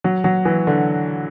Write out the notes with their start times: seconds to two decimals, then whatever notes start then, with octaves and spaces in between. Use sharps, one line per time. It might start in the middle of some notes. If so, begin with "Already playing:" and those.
0.04 F#3
0.24 F#3
0.45 E3
0.67 D3